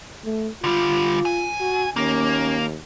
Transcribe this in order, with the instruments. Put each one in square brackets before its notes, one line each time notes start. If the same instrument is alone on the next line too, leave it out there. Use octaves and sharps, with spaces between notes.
[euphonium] A3
[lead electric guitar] D3 G3 [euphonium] F4
[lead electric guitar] G#5
[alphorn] F#4
[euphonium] D#2 [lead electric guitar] A#3 A#4 [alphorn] C#4